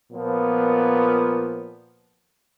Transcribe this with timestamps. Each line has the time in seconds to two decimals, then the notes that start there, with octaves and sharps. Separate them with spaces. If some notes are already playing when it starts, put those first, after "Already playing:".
0.12 A#2 F3 B3